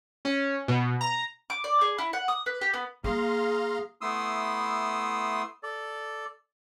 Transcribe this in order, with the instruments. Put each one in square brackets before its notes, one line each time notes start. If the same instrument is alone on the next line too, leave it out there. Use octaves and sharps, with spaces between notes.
[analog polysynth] C#4
B2
A#5
[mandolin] D6
D5
G#4
E4
F#5
D#6
B4
G4
B3
[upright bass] A#3 [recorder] G#4 [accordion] F5 A#5 C6
[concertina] A3 B3 E4 C6 D#6 E6
A4 D5